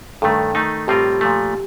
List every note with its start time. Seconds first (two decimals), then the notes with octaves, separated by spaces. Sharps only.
0.22 G2 D#3 A3 A4
0.55 D#3 A3 D#4
0.88 A2 G3 C4 F4 G4 A#4
1.21 A#2 F3 A3